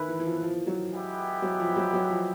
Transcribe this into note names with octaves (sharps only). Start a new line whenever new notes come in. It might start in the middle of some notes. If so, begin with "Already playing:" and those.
Already playing: D#3 E4 G#4 B4
E3
E3
F3
F3
F#3
G#3 B3 E4 G4 B4
F#3
F3
F#3
F#3
F3